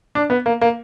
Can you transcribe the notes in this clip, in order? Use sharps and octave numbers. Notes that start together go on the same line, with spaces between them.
D4
B3
A#3
A#3